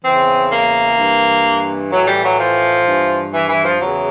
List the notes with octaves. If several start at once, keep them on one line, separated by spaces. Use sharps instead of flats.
E2 C#3 E3 C4
A#3
G2 E3
A2 E3 F#3
G3
F#3
F3
G2 E3
E3
E3
F3
E2 C#3 E3 F#3